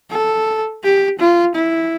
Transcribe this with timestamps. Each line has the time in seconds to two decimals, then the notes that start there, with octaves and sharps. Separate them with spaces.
0.10 A4
0.83 G4
1.19 F4
1.55 E4